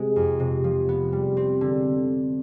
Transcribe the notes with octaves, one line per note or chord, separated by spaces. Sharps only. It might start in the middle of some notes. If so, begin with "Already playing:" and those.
Already playing: C3 G#3
F2
C3
F3
B3
G3
C4
D3